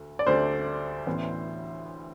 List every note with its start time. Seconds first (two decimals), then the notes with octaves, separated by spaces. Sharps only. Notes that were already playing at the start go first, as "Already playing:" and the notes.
Already playing: D2 A3
0.19 D5
0.27 D2 D3 A3 C5
1.06 A1 A2 E3 B3